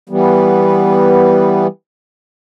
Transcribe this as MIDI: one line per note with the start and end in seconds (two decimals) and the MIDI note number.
0.09 1.67 52
0.09 1.67 55
0.09 1.67 59